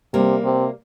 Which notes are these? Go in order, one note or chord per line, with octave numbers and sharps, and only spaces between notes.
C3 G3 A#3
C3